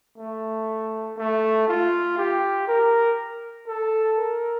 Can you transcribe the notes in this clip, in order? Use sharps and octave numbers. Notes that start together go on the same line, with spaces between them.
A3
A3
F4
G4
A#4
A4
A#4